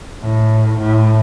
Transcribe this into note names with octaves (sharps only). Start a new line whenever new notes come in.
A2
A2